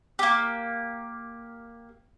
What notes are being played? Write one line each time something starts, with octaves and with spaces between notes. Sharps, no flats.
A#3 G4